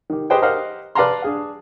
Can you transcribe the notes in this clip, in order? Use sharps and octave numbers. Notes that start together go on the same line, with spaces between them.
D#3 G4
G4 G#4 B4 C5 D#5 G5
G4 A#4 C5 D#5 F5 F#5
B4 D5 F5 A5 A#5 C6
D4 G#4 F5